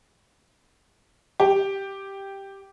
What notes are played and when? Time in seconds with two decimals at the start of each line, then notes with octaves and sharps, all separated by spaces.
1.40 G4